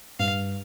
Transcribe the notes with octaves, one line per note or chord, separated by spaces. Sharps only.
G2 F5